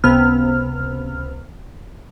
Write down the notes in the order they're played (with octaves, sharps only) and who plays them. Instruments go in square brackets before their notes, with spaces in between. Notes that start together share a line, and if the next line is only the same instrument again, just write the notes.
[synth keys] C#2 C3 B3 F6